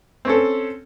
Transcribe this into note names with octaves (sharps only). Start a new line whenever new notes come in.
C4 C#4 A4